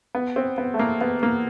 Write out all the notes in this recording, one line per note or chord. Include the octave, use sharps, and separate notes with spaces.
B3
C4
B3
A3
A#3
B3
A#3